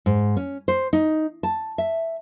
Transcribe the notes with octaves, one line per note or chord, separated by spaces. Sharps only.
G#2
C#4
C5
D#4
A5
E5